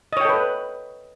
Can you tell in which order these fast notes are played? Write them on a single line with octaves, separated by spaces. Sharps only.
D#5 C#5 G5 A4 B4